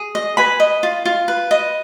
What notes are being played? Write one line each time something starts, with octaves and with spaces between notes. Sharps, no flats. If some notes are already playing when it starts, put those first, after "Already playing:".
Already playing: G#4
D#5
B4 G#5 B5
D#5
F4
F4
B4
D#5